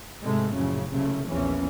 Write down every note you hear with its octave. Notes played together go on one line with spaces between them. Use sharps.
G#2 C3 G#3 A3
A#1 F#2 A2 C#3
F#1 C2 C#3 A3
A#1 E2 E3 C#4